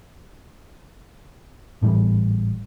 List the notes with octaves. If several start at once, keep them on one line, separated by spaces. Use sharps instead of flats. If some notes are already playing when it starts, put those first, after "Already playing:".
G#1 A2 E3 G3